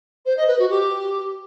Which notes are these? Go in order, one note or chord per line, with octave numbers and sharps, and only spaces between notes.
C5
D#5
B4
F#4
G4